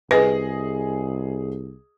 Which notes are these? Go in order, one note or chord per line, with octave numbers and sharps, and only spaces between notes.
C2 G#4 B4 D#5 A#6